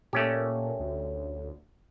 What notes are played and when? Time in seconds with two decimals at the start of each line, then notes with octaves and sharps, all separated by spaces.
0.13 A#2 A3 C#4 G4
0.80 D2